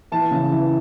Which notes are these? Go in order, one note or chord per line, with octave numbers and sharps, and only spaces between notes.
E3 A5
C#3
E3